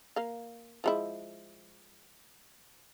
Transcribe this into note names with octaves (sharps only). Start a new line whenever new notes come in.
A#3 F5
F3 G#3 E4